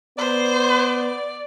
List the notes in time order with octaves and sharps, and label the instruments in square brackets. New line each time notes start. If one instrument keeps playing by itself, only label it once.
[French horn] B3 [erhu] C5 [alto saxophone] D5